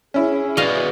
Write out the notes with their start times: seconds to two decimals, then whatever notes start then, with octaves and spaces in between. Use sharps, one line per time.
0.14 C#4 E4 G#4
0.57 F#4 B4 D5 D#5 F5